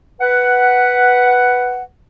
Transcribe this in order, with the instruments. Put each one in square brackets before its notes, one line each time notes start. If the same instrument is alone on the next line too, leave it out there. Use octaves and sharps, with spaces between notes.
[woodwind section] B4 F#5